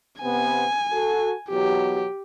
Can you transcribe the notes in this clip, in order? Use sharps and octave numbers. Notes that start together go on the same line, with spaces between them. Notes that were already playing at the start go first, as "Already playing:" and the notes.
C3 B3 G#5
F#4 A4
E2 B2 F#3 G4